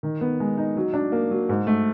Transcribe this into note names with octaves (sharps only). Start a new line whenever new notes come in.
D#3
B3
G#3
D#4
F#3
D4
A#3
F#3
G#2
A3